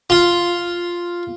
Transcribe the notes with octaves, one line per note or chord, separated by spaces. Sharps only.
F4